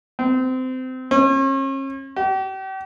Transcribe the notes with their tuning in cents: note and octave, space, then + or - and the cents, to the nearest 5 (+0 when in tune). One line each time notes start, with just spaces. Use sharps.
C4 -25
C#4 -40
G4 -40